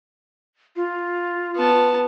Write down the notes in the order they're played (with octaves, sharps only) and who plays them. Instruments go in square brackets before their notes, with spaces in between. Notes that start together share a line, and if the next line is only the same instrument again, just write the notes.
[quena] F4
[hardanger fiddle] B3 A5